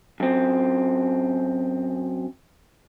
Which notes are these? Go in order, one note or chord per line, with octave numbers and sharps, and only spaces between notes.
F#2 C4